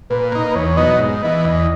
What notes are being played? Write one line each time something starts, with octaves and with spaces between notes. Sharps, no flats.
A#2 B4
A#3 D#4
B4
E2 C#5
B2 F#3 B3 D#4 D#5
G#2 D#5
E3 B3 D#5
E2 D#5